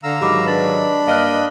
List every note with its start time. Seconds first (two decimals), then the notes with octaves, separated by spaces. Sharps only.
0.03 D3 F5 A#5 E6
0.21 G#2 D#3 F#3 G4 B5 D6
0.46 D4 B4 B5 A6
1.07 G2 A#3 D#5 F5 F6 F#6